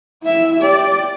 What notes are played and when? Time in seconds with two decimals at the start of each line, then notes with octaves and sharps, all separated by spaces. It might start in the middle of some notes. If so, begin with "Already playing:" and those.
0.23 E4 E5
0.60 G4 D5